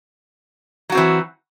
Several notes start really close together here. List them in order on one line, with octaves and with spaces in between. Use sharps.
F#3 F#4 C4 E3